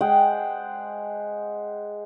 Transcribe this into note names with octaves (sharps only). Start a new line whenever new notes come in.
G#3 C5 F#5 G5